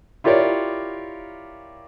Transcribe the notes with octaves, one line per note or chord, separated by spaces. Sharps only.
E4 F4 G4 A#4 C#5 D5